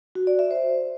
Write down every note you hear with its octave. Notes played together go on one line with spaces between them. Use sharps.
F#4
D5
E5
C5